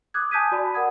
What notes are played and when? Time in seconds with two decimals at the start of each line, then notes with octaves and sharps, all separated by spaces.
0.14 D6 D#6 F#6 G#6
0.31 G#5 A5 D#6 G6 B6 D#7
0.52 F#4 D5 A5 B5
0.74 A#4 F#5 D#6 G#6